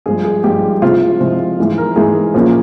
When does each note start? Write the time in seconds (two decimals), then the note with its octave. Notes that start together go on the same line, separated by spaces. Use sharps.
0.06 G2 F3 G#3 G#4
0.24 G#4
0.44 G2 F3 G#3 G4
0.82 C3 F3 G#3 C4 E4 F4
1.20 C3 F3 G#3 C4 E4
1.58 G#2 E3 G#3
1.78 A#4
1.96 G#2 E3 G#3 G#4
2.34 A#2 F3 A#3 C#4